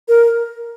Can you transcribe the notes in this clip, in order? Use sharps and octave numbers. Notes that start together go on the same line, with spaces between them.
A#4